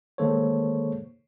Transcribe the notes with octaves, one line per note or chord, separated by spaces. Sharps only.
D#3 G#3 A#3 A4 C5 C#5